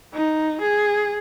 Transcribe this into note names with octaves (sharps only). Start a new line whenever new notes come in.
D#4
G#4